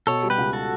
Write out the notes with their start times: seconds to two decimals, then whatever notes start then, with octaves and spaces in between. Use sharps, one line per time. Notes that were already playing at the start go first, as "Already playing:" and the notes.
0.07 B2 A4 C#5
0.23 G3
0.30 G4 B4
0.38 C#2
0.53 F#4 A4